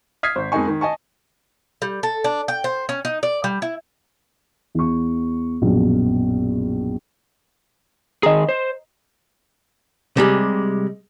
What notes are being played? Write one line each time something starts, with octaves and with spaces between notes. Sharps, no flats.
D#6 F6 G#6 B6 C7
G#1 C5
F2 G#3 A#3 D#4 G#5 C#6
D#3
D#5 G#5 A5 C#6
G3
A4
D4
G5
C5
C#4
D#4
D5
G3
E4
E2 C#6
A#1 F#2 B2
D#3 G#4 D#5 A#5
C5
C3 G3 G#3